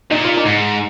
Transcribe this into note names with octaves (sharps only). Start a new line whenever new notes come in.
A#2 D#4
F4
D#4
G#2